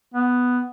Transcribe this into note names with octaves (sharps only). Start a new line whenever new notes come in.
B3